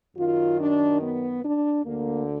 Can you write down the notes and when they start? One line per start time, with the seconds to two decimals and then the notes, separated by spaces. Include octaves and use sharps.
0.16 F#2 D#3 F4
0.59 D4
1.00 B3
1.43 D4
1.84 D2 D3 A#3